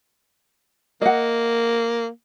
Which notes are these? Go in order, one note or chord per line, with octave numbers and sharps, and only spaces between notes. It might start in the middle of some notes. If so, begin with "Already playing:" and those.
A#3 D#5 F#5